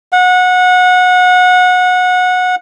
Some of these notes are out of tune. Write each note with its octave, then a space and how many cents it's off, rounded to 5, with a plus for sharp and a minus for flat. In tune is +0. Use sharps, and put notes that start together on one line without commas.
F#5 -25